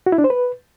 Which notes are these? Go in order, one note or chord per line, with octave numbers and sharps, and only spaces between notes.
F#4
E4
D4
C5
B4